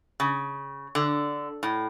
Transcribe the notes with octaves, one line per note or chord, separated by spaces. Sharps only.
C#3
D3
A2